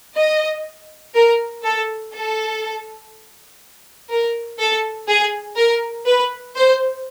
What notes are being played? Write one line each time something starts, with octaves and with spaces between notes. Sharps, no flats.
D#5
A#4
A4
A4
A#4
A4
G#4
A#4
B4
C5